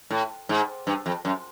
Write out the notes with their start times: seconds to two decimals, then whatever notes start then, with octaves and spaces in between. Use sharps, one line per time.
0.10 A2
0.49 G#2
0.87 G2
1.06 F2
1.25 F#2